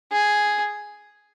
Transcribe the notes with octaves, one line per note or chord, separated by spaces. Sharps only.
G#4